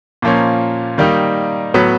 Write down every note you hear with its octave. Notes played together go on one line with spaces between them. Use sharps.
A#2 F3 A#3 C#4
D#3 G3 A#3 D#4
A2 F#3 B3